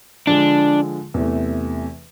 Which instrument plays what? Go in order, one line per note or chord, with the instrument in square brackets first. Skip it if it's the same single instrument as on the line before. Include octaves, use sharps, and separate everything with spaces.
[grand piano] D3 F3 G#3 [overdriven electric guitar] D4
[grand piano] E2 C3 E3 A3